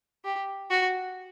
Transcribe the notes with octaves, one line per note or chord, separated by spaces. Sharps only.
G4
F#4